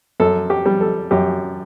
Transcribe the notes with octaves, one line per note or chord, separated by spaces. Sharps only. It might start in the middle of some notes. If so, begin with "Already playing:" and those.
F#2 A4
G4
G3
A4
F#2 G4